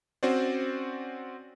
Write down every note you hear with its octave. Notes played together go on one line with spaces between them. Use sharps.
C4 C#4 F#4 C5 D5